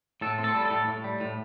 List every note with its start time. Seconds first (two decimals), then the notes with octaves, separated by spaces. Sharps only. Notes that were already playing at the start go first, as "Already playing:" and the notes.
0.21 A2 A4
0.38 C4
0.44 A4
0.55 G3
0.66 A2 A4
0.87 A2
1.04 G3
1.20 A2